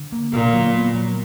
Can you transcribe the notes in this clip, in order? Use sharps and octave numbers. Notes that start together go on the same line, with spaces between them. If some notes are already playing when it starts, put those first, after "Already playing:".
Already playing: D3
A#3
A#2 D3
F#3
B3
F#3